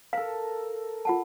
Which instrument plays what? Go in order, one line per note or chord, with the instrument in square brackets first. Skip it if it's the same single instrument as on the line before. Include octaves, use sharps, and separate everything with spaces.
[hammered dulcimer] A4 A#4 [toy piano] F5
[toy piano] F4 F#5 A5